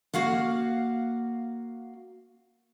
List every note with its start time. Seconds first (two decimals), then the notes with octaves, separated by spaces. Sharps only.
0.13 A#3 F#4 F5 F#5